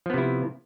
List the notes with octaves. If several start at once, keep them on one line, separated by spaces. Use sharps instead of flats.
C3 F3 B3 E4